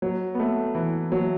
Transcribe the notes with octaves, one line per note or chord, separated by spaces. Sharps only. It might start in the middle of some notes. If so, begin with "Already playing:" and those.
F#3
B3
A3
E3
F#3